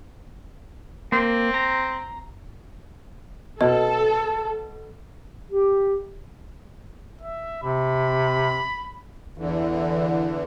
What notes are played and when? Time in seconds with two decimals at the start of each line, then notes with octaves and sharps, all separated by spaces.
1.12 A#3 C4
1.54 A#5
3.61 B2 A4 D#5 A5
5.52 G4
7.21 E5
7.63 C3 B5
9.38 E2 D3 E3